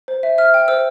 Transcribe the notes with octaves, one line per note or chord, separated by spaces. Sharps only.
C5
E5
E5 F6
G5
C5 E6